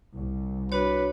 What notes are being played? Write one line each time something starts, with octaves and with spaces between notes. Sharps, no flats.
C2
D4 F#4 B4 C#5